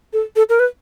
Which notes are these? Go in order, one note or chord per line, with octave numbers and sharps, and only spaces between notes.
A4
A4
A#4
B4